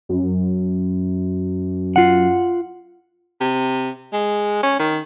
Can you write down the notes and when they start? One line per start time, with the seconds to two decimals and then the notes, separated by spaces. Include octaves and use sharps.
0.09 F#2
1.96 F4 F#5
3.41 C3
4.13 G#3
4.63 C#4
4.79 D#3